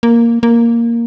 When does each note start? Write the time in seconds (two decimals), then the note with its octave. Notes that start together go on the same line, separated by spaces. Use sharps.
0.03 A#3
0.43 A#3